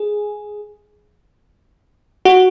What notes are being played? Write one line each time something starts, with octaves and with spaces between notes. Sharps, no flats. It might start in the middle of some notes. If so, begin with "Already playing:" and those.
Already playing: G#4
F#4